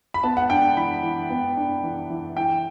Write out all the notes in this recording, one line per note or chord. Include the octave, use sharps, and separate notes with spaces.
B5
B3 A5
F#5
D4 G5
E3 B5
E3
B3
D4
E3
E3
E3 G5